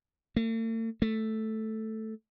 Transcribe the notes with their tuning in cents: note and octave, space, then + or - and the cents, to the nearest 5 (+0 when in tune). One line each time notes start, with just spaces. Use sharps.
A3 +45
A3 +0